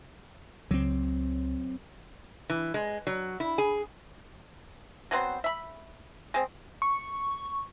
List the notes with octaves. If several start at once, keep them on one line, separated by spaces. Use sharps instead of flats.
C#2 F#3 C4
E3
G#3
F#3
E4
G#4
F#3 B3 C4 C5
E5 B5
G#3 C4
C#6